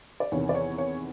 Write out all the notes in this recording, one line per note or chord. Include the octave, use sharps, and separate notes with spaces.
D5
E2 C3 D#3 C#5
D5
C#5
C#5